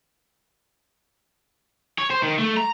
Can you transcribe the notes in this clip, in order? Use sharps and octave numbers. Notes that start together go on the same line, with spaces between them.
C#5
C5
D#3
A3
A#5